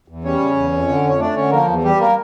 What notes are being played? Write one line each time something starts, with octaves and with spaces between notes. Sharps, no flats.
E2
G3 C#4 C#5
C#3
E2
F2
D3
F2 C#5
A3 D4 D5
D3 C#4 C#5
F3 A#3 A#4
E2
G3 G4
A#3 A#4